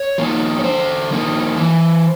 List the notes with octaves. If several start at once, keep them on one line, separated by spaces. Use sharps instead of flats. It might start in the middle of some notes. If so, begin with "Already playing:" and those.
Already playing: C#5
F3 A#3 D#4
C#5
D3 C5
F3 A#3 D#4
E3